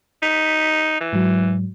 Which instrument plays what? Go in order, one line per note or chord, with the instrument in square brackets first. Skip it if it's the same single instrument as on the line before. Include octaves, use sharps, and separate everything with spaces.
[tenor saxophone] D#4 [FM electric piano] B6
[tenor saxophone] E3
[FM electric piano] G#2 F#3